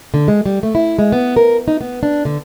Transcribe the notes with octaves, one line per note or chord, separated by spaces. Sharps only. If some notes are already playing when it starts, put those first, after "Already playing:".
D3
G#3
G3
A3
E4
G#3
B3
A#4
D#4
B3
D4
D3